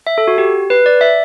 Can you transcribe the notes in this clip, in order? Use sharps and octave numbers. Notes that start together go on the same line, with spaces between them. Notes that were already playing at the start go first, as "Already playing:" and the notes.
E5
A4
F#4
G4
B4
D5
E5